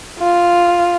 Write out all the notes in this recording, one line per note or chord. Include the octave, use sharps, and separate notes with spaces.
F4